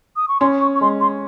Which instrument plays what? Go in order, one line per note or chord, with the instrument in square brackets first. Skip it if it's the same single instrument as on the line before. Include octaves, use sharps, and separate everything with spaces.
[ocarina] D#6
C#6
[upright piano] C#4 [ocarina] C6
[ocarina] C#6
C#6
[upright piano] G#3 [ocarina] C6
[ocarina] C6